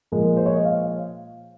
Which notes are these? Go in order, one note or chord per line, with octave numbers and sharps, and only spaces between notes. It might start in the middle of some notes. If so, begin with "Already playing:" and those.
A#2 F3 G#3 A#4
C5
C#5
D#5
F5